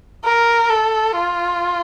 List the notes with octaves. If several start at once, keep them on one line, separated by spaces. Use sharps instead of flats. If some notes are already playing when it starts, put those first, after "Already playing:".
A#4
A4
F4